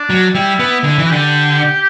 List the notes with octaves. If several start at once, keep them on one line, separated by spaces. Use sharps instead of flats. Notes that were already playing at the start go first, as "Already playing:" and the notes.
Already playing: D4
F#3
G3 E4
B3
D3
E3
F#4
D3 G4